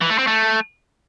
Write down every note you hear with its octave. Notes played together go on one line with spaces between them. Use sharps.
E3
A3
C4
A3